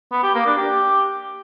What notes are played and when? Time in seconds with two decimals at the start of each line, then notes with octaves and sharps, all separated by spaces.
0.12 B3
0.23 G4
0.35 A#3
0.46 D4
0.57 G4